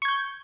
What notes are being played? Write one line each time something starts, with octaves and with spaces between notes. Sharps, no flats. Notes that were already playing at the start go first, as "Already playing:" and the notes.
C#6 G6 G#6